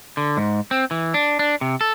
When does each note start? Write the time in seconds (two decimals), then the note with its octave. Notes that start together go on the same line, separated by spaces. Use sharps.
0.17 D3
0.37 G#2
0.71 C4
0.91 E3
1.14 D4
1.39 D4
1.61 C3
1.81 A4